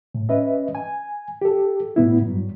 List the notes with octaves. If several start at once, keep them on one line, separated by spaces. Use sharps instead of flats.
A2
C#4 B4 D#5 E5
G#5
G4 A4
A2 B3 E4
G2 F#3